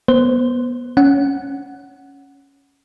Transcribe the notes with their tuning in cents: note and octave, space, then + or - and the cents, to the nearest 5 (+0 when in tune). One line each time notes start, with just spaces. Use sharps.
B3 -25 C5 -15
C#4 +0 F#5 +0